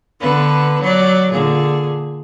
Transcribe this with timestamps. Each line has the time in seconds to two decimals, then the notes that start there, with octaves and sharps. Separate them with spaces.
0.21 D3 B3 B4
0.82 F#3 D5
1.32 A#2 D3 G#4